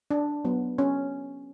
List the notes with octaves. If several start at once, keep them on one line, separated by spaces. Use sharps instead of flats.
D4
F#3 B3
C#4